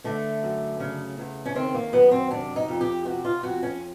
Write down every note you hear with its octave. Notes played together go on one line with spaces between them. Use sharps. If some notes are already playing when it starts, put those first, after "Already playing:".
D3 A3
F#2
C#3
E2
C#4
D#3 C4
A#3
F#2 B3
C4
C3 D4
D#4
F2
G4
C3 F#4
F4
F2 F#4
C#4